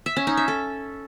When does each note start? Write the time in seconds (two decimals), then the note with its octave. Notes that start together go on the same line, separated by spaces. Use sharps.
0.06 E5
0.17 C#4
0.27 D#4
0.37 E5
0.48 A4